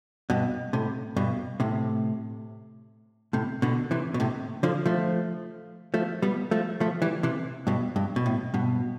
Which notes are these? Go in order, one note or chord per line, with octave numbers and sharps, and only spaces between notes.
G2 B2
A2 C3
G2 B2
A2 C3
A2 C3
B2 D3
C3 E3
B2
A2 C3
D3 F3
F3 A3
F3 A3
G3 B3
F3 A3
F3 A3
E3 G3
C3 E3
G2 B2
G2
B2
A2
G2 B2